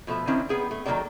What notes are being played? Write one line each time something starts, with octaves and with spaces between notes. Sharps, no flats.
B2 F3 A3 E5
D3 D#3 C4 C#4 E4
B3 G#4 G5
A3
D#3 F#3 A#3 A4 D5 G5